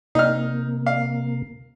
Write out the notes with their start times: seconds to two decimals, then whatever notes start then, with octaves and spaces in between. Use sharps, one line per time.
0.15 C3 A#3 D#4 F6
0.86 F5